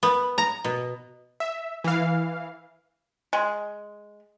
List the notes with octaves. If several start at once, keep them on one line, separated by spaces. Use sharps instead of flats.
B3
A#5
B2
E5
E3 F5
G#3